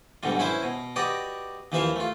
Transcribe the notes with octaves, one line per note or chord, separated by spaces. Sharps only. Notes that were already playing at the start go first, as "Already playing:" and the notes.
B1 G#2 B2 D3 G3
C#4 E4 B4 C5
B2
F#4 G4 B4 D5 D#5
D#2 E3 F3 B4 E5 F5
A3 F4